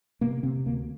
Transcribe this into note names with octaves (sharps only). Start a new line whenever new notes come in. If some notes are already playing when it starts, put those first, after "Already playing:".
C3 A#3
C3 C4
D2 A#3